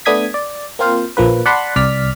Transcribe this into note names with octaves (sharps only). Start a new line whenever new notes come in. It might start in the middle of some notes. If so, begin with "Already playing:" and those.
A3 B3 D4 D#6 G#6 B6
D5
A#3 C4 F4 C5 F5
A#1 F3 A#3 B4
D5 F#5 A5 B5 C6
C2 D5 F6 B6